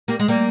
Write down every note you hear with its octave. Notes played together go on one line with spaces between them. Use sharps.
G3 A#3
G#3
G3 A#3